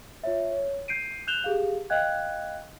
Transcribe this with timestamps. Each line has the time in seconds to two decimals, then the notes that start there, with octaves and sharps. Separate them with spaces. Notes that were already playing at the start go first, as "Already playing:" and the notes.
0.24 F4 C#5 E5
0.51 C#5
0.88 G6 C7 D7 D#7
1.27 F#6 G6 E7 F7 G7
1.44 G4 G#4 F5
1.90 D#5 F5 G5 F#6 G#6